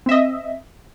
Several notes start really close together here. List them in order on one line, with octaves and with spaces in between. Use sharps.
C4 E5 D#5